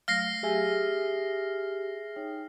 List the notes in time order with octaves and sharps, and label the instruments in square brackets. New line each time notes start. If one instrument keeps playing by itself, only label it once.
[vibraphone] F#3 A3 [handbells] F5 [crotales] F6 A#6 C7
[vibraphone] G4 [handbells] G#4 E5 G#5
[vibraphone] D#4 C#5 G5